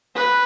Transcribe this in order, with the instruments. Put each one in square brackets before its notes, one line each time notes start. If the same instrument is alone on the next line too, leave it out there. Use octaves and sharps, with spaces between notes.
[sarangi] B4